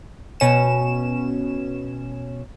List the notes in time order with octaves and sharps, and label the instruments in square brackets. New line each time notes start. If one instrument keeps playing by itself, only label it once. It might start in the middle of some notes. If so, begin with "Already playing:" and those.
[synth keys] B2 C#4 E7